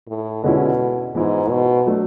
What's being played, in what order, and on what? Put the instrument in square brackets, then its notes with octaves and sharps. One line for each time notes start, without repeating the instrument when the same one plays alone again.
[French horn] A2
[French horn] B2 [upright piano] D3 G#3 C#4 E4
[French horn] G#2 [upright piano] E3 B3 E4
[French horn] B2
[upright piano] F#3 A3 D4